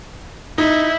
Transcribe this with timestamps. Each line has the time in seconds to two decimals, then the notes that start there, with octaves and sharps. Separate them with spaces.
0.58 D#4 E4